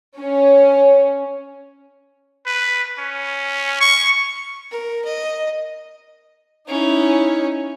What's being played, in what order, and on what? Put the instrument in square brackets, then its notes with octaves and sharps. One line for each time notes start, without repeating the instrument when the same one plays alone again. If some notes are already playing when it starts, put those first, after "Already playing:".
[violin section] C#4
[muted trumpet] B4
C#4
C#6
[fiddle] A#4
D#5
[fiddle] C#4 [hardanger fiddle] D#4 E4